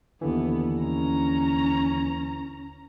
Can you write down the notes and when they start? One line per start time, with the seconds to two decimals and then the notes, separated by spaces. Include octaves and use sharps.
0.21 D#2 D3 E3 B3
0.82 C#4 A#5